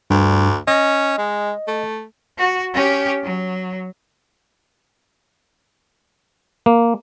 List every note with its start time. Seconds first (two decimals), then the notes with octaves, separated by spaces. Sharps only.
0.10 D2 G2
0.67 C#4 D#5
1.18 G#3
1.68 A3
2.38 F#4
2.73 C#4 G4
3.24 F#3
6.66 A#3